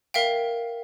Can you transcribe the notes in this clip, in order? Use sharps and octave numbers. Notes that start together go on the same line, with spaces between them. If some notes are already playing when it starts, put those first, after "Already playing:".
A#4 E5 F5 G5